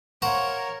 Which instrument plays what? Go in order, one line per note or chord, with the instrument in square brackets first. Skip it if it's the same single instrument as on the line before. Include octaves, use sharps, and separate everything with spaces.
[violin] A#4 C#5 [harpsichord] C5 F#5 A#5 [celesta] F5 C#6